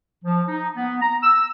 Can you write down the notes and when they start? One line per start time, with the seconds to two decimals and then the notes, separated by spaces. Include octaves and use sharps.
0.25 F3
0.48 D#4
0.77 B3
1.01 A#5
1.23 E6